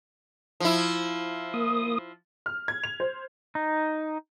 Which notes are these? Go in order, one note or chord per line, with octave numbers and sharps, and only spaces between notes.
F3 E4
A#3 D#6
F6
G#6
F7
C5
D#4